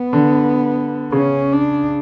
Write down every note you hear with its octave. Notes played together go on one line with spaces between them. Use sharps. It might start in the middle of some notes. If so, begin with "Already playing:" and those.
Already playing: B3
D3
C#3 C#4
D4